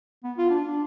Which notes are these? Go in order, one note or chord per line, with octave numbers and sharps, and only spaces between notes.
B3
F4
D4
D4